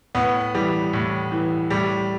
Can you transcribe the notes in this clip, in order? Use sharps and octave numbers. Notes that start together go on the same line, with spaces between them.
A2 B3
E3 G3
A2
E3
A2 G3